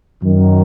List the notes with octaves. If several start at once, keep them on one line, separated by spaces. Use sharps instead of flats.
F#2 D#3 F#3